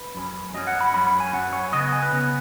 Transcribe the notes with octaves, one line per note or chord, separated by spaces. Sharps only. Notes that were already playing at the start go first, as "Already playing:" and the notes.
Already playing: B4
F#2 F#3 C#4
F#2 F#3 C#4 D#5
F#5
B5
F#2 F#3 C#4 B5
B5
G#5
F#2 F#3 C#4 F#5
C#5
C#3 B3 D#5
D#5
G#5
B4
C#3 B3